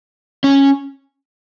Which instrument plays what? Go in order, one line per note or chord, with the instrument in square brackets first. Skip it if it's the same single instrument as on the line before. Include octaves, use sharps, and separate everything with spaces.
[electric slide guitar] C#4